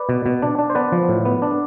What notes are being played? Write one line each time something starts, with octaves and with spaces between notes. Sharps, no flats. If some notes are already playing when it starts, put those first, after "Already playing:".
Already playing: B4 D5
B2
B2
D4
D4
C5
B3 B4 D5
F3
A2
B3
D4